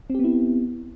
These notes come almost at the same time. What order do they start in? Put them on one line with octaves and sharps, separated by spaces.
C4 G4 B3 E4